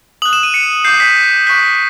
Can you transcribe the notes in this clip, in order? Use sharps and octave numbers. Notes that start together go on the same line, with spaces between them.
D#6 F#6 F#7
E7
D#7
C#7
D6 G6 C7
B6
C#6 F#6 B6